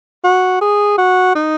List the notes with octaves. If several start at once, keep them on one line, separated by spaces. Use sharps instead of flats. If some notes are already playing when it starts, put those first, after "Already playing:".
F#4
G#4
F#4
D#4